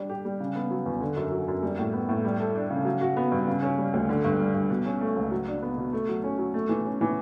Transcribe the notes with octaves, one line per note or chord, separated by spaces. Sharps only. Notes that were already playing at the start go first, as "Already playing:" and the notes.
Already playing: G3 D4
G4
G3
C#3
B3
F#3
E2
D3
F#2
F#3
F#2
G3
A2
B3
A2
G3
A4
D4
C#3
F#3
F#4
B3
G2
C#3
C#4
G3
D2
D3
G2
G3
G2
B2
C#4
A3
C#2
F#3
D4
B3
B2
A3
F#3
C#4
F#3
A3
E3
C#4
E3